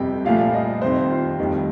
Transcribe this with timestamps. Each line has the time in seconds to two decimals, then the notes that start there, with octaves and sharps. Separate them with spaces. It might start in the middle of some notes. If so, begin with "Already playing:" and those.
Already playing: G1 F2 C3 G3 G5
0.25 C2 A#2 F3 A3 F5
0.54 D#5
0.82 F2 C3 D#3 C5
1.11 F4
1.39 F1 F2 D#3 G3